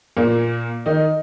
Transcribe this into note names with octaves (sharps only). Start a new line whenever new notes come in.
A#2 A#3
D#3 D#4